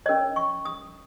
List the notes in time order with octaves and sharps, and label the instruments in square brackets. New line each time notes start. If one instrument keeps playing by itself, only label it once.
[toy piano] C#4 A#4 C#5 D#5
C#6
D#6